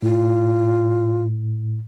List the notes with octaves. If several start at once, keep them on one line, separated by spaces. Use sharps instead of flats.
A2 F4